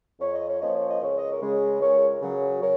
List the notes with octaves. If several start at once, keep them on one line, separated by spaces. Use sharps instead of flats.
F2 C#5
D#5
C#5
F3 A#3 C#4 D#5
C#5
D#5
C#2 C#5
D#5
A#4 C#5
C#3 G#3
C#2 A#4 C#5
C#3 F#3
A#4 C#5